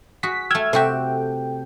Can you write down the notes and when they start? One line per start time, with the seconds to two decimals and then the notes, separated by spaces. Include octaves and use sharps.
0.23 F#4 G#4 B6
0.50 A3 G5 E6 F6 G#6
0.73 C3 F#4 A4 E5 G5